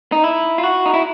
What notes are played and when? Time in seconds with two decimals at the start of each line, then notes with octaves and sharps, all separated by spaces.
0.12 D#4
0.24 E4
0.58 F4
0.63 F#4
0.86 D#4
0.94 E4